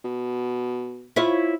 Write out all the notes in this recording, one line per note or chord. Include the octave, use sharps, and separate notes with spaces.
B2
E4 F4 C#5